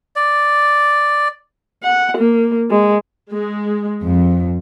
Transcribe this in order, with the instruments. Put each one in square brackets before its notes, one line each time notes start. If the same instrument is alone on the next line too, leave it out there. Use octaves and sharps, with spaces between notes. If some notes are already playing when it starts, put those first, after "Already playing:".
[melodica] D5
[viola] F#5
A#3
G#3
[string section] G#3
F2